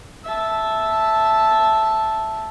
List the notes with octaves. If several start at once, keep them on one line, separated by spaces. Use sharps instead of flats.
E5 A5